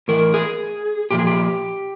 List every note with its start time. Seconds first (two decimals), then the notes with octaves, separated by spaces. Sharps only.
0.08 A2 E3 A#4
0.34 G#4
1.11 A#2 F3 G4
1.19 G#4
1.27 G4